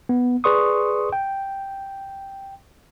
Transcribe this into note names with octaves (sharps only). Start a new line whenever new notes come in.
B3
G#4 B4 D5 C6 C#6 D#6
G5